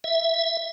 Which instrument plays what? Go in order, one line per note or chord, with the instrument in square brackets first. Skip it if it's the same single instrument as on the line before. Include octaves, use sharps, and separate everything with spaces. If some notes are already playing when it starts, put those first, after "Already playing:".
[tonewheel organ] E5